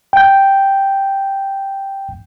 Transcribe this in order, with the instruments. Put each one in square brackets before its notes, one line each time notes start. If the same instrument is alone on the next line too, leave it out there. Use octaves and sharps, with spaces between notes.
[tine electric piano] G5 G6